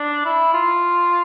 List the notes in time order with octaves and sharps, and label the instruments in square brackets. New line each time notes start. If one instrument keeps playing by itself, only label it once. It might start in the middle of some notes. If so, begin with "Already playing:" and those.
Already playing: [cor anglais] D4
E4
F4